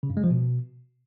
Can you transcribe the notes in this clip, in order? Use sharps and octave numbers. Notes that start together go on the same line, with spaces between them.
C#3
G2
G#3
F3
B2